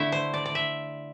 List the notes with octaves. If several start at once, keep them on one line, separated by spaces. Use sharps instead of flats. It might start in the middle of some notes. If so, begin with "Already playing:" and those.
Already playing: D3 A3 E4 E5
C5
D5
D5
E5